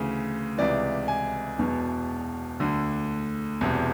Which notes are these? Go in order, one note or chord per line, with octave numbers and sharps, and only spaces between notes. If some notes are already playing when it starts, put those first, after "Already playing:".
Already playing: D2 C#3 E3
C#2 C3 E3 D5
G#5
E1 E2 B2
D2 D3
E1 E2 C3